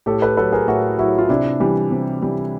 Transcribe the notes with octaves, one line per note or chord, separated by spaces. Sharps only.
A2 G4 A4
A4 B4
F#3 A4 B4
G#4 A#4
A2 E4 F#4
F#3 E4 F#4
F4
C3 D4 E4
E3 G3
C3
E3 G3